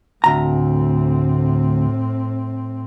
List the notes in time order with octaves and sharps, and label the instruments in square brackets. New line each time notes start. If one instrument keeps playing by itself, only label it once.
[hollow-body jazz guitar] D2 A#5 [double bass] A2 C4